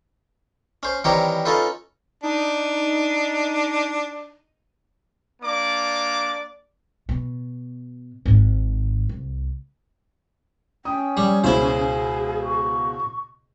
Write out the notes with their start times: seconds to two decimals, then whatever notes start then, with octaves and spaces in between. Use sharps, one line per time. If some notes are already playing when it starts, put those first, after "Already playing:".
0.83 C#4 C5
1.04 D#3 E3 G3 C4 A#4 C#5
1.45 C#4 D#4 F4 A4 B4
2.23 D4 D#4 D#7
5.42 A#3 D4 D5 D6
7.09 B2
8.26 G#1 G#2
9.09 C2
10.85 C#4 G5 D#6
11.17 G3
11.44 C#2 B2 E4 G#4 C5
12.43 C#6